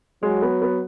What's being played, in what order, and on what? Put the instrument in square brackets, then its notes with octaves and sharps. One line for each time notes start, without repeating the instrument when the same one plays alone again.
[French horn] F#3 [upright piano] G#3
[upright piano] B3
B3